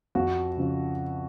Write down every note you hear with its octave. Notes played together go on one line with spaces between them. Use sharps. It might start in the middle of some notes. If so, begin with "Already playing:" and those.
F2 F#4
C#3 F3